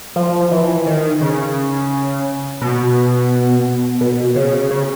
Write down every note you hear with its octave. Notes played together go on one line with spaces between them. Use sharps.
F3
E3
D#3
C#3
B2
B2
C#3
C#3